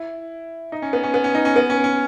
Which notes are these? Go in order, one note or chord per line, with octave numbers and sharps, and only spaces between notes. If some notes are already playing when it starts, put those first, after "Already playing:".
Already playing: E4
D#4
C#4
B3
C#4
B3
C#4
D#4
C#4
B3
C#4
C#4